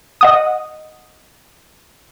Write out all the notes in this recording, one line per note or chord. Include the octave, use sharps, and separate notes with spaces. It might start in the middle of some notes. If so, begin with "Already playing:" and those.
D#5 F#5 D#6